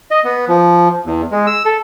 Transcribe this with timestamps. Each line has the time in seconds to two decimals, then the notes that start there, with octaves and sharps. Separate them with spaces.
0.11 D#5
0.25 B3
0.48 F3
1.06 E2
1.32 G#3
1.47 E6
1.65 A4